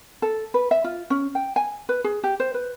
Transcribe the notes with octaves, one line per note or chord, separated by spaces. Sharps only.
A4
B4
E5
F4
C#4
G5
G#5
B4
G#4
G4
C5
B4